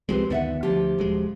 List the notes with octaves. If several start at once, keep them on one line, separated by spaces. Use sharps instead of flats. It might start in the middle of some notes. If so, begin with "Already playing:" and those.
C2 F3 G#3 C4 G4 B4
D2 D#3 B3 D5 E5 F#5
D2 F3 G4
D#1 F#3 G#3